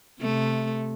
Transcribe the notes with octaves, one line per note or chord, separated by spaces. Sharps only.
C3 A3